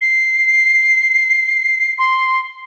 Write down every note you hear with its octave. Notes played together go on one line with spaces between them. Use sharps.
C7
C6